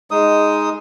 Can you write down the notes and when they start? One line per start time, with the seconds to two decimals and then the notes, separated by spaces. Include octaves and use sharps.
0.11 G#3 D#4 D#6